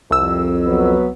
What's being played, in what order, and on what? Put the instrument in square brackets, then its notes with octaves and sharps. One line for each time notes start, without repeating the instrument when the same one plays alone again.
[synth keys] C2 E6 [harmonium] F2
[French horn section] F#3 B3 B4